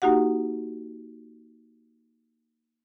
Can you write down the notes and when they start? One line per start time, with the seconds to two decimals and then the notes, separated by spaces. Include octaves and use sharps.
0.02 A#3 D#4 F#4 G4 F#5